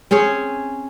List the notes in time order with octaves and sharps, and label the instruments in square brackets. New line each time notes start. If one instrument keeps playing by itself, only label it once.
[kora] C4 C#4 G#4 C#5